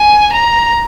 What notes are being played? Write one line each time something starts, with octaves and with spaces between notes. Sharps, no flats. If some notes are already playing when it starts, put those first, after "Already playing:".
Already playing: G#5
A#5